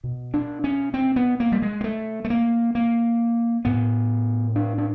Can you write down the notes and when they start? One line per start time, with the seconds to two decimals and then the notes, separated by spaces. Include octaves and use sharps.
0.04 B2
0.34 D4
0.64 C#4
0.94 C4
1.16 B3
1.40 A#3
1.52 G3
1.62 G#3
1.81 A#3
1.84 A3
2.25 A3
2.30 A#3
2.75 A#3
3.65 A2 B3
4.56 D4
4.78 D4